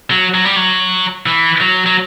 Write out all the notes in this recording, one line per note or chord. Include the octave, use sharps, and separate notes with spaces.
F#3
F#3
G3
F#3
E3
F#3
F#3